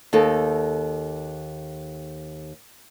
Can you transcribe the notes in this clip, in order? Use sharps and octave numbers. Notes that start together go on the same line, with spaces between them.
D#2 D#4 A4